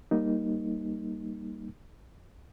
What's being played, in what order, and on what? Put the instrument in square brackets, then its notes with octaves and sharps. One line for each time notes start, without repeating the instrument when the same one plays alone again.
[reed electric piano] G3 A#3 D#4